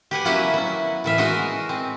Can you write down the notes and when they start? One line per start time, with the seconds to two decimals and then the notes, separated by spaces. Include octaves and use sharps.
0.11 G4 B4 F#5 G#5
0.25 F#3 A#3 B3 C#4 E4 F#4
0.54 B3 E4
1.04 A2 E3 E5 F5
1.18 E3 G#3 D#4 F#4 A#4 D#5
1.69 C4